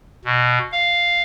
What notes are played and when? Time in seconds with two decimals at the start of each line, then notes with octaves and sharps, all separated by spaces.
0.25 B2
0.72 F5